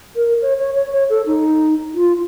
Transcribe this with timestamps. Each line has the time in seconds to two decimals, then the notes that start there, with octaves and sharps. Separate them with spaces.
0.16 A#4
0.42 C#5
0.59 C#5
0.76 C#5
0.92 C#5
1.10 A4
1.26 D#4
1.95 F4